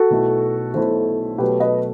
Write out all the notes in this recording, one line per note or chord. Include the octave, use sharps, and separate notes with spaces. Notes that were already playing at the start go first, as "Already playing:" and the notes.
Already playing: F#4 A4
B1 B2 A3 E4
B1 B2 A3 E4 A4 C5
B2 F#3 A3 G4 B4
B4 D#5